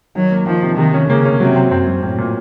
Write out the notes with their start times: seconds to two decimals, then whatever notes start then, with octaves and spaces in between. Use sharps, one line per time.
0.15 D#3 F#3
0.31 A#3
0.47 D#3 F3
0.63 C3
0.78 C3 D#3
0.94 C#4
1.09 C#3 A#3
1.25 C#4
1.40 C3 F#3
1.56 C4
1.71 F#2 C4
1.87 F#3
2.03 A2 C4
2.18 A#2